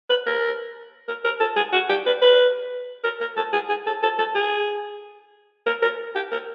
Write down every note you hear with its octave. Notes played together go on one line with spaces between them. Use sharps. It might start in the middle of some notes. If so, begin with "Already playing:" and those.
B4
A#4
A#4
A#4
A4
G#4
F#4
G4
B4
B4
A#4
A#4
A4
G#4
G#4
A4
A4
A4
G#4
A#4
A#4
G4
A#4